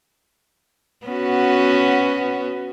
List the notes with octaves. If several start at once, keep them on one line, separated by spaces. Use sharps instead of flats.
B3 C#4 F#4